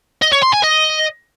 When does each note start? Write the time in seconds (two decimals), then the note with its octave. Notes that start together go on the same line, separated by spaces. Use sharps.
0.22 D#5
0.32 C#5
0.42 C6
0.53 G#5
0.63 D#5